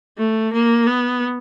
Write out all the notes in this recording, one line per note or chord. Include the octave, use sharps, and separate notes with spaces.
A3
A#3
B3